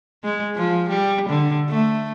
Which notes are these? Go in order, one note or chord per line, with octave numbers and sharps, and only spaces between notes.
G#3
F3
G3
D3
A3